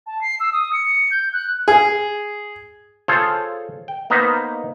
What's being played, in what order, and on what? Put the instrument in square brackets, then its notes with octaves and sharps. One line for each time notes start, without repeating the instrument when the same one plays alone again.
[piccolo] A5
C7
E6
D#6
C#7
C#7
G6
F#6
[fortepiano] G#4
[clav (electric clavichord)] F4 G#4 A4 C5 C#5
G5
A#3 B3 D#4 B4 C5